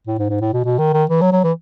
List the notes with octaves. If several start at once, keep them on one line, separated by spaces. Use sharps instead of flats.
A2
G#2
G#2
A2
B2
B2
D#3
D#3
E3
F#3
F#3
E3